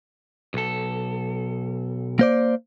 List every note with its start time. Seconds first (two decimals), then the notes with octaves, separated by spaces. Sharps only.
0.54 B1 A4
2.19 A#3 C5 D5